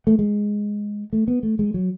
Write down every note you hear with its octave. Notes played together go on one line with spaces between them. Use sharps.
A3
G#3
A3
B3
A3
G#3
F#3